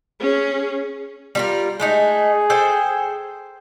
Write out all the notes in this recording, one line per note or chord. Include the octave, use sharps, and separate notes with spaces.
C#4 G#4
G3 F4 A#4
G#3 A3 D#4 G#4
A4 C5 G5